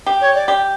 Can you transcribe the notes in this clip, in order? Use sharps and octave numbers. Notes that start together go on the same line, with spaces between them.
G4
C#5
D5
G4